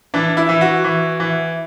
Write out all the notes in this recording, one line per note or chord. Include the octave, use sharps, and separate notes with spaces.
E3 D4
E4
E3
F#4
E3
E3